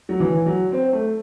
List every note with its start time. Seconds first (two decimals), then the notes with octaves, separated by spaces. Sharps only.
0.09 F#3
0.20 E3
0.46 F#3
0.72 C4
0.93 A3